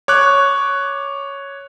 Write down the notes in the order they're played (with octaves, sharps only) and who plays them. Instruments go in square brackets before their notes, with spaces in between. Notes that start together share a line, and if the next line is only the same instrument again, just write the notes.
[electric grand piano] C#5 D6 F#6